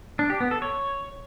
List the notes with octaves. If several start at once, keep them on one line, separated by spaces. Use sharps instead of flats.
D4
G4
B3
A4
C#5